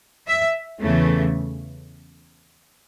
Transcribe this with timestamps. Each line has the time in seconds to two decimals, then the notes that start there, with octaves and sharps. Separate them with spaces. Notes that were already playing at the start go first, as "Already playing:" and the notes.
0.28 E5
0.81 E2 C#3 E3 A3